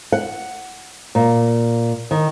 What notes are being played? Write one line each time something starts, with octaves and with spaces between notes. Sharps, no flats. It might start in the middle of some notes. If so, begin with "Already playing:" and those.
F#5
A#2
D#3